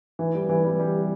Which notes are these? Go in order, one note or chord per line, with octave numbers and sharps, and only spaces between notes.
E3
G3
E3
G3
G3